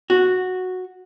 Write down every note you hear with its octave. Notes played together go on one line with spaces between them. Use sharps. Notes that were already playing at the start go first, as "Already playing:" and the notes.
F#4